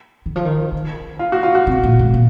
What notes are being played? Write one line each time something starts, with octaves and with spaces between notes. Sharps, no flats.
D#3
F3
D#3
C#3
F4
F#4
F4
F#4
C3
A#2
G#2
A#2